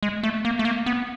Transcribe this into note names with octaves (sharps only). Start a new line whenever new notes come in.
G#3
A3
A#3
A3
A#3
B3